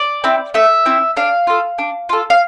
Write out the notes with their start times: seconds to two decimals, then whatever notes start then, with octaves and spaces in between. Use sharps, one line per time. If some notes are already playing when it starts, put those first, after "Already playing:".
Already playing: D5
0.24 C4 E4
0.54 A3 E5
0.86 C4 E4
1.17 D4 F5
1.47 F4 A4
1.78 D4
2.09 F4 A4
2.30 F5